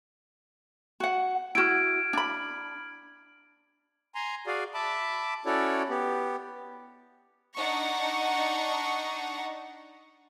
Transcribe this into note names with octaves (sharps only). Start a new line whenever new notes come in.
F#4 F#5
E4 F#4 F6 G#6 D7
D4 B5
G#5 A#5 C6
F#4 G#4 D5 F5 G#5
E5 A5 B5 D6
C#4 E4 F#4 A4 C#5 D5
B3 G4
D4 D#4 F#5 C#6